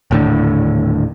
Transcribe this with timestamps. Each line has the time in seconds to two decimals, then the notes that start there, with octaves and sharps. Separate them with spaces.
0.11 D#1 A2 D3